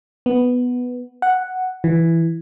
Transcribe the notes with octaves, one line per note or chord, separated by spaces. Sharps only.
B3
F#5
E3